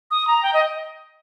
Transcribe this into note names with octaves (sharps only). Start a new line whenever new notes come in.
D#6
A#5
G5
D#5